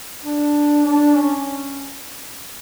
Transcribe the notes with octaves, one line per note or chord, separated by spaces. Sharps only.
D4
D4
C#4